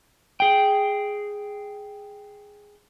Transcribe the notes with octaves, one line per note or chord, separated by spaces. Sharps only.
G#4 G5